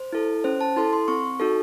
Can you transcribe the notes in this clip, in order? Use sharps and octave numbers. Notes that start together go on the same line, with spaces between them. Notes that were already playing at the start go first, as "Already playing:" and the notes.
Already playing: C5
E4 A4
C#4 C5
A5
E4 A4 C6
C6
C4 C#6
D#4 F#4 A4